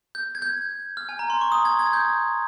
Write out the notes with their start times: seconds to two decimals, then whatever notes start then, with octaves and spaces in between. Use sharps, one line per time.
0.15 G6
0.35 G#6
0.42 G6
0.97 F6
1.09 G#5
1.19 A#5
1.30 C6
1.41 C#6
1.52 D#6
1.65 G#6
1.79 G#6
1.93 G6